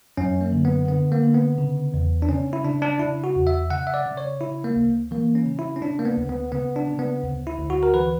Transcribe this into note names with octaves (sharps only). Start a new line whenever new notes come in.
F#2 C#4
A#3
D3
B3
D3 B3
A#3
D3
B3
C#3
E2
D4
C#3 C#4
E4
C#3 D4
D4
C#3 E4
F#4
E2
E5
C#3 F#5
E5
D5
C#3
C#5
C#3 E4
A#3
D2
E3 A#3
C#4
C#3
E4
C#4
C#3 D4
A#3
B3
D2
B3
C#3 B3
D4
C#3
B3
D2
E4
D2
F#4
A#4
E3 B4